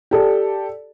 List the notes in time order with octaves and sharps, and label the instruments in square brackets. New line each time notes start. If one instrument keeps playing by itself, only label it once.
[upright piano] G4 A4 D5